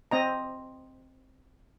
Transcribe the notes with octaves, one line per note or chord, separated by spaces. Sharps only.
C4 D#5 A#5